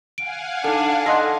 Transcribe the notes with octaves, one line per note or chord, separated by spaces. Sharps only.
F5 F#5 G#5 D7
D4 D#4 A4
A4 D#5 F#5 C6 A#6